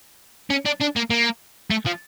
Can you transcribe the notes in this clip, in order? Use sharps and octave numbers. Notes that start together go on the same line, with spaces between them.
C#4
D4
D4
A#3
A#3
A3
F3